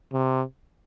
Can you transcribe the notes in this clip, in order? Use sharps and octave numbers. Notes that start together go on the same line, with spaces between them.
C3